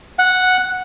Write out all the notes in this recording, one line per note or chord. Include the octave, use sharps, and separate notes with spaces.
F#5